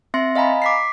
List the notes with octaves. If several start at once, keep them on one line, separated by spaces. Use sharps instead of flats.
C4 E5 C6 A#6 C#7
D#5 F5 G#5 A#5 B5
D6 B6 C7